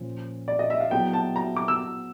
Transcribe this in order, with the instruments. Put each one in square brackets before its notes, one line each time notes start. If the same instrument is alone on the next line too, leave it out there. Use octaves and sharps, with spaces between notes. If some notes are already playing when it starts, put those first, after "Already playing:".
Already playing: [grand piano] A#2 F3 C#4
[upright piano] D5
D#5
E5
F5
[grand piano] F#3 B3 E4 G#4 [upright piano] G5
[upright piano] A5
A#5
D6
E6